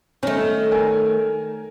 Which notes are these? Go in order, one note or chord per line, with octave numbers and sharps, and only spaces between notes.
D#3 A3 C#4
A#4 G#5